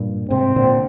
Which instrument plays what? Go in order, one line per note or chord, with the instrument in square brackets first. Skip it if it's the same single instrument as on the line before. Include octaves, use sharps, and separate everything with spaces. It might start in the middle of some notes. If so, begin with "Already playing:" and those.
Already playing: [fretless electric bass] G2 A#2
[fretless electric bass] G#2 C3 [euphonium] C4
[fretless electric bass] A#2 D3